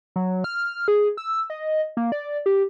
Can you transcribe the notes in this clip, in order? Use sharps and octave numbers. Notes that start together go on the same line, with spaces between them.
F#3
F6
G#4
E6
D#5
A#3
D5
G4